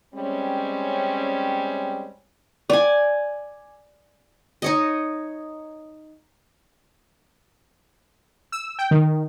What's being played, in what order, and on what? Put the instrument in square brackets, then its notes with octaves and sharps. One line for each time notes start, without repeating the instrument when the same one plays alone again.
[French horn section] G3 G#3 C4 C#4
[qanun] D5 G#5
D#4 C#5 D#5
[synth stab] E6
G5
D#3